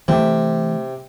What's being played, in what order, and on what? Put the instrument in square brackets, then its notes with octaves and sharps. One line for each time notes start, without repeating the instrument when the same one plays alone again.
[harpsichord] C3 [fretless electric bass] E3 A3